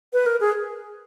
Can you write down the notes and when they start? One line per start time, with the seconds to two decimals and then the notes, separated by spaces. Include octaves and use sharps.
0.13 B4
0.26 A#4
0.40 G#4